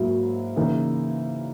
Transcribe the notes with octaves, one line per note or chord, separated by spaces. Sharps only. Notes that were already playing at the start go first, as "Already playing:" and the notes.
Already playing: G#2 F#3 A#3 E4
C#3 E3 A#3 D#4